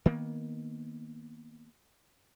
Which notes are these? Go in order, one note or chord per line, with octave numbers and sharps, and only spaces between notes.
D#3 A#3 B3